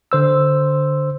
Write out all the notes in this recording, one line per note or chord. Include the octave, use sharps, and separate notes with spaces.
D3 C5 E6